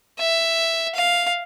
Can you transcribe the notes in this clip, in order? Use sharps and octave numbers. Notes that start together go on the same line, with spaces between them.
E5
F5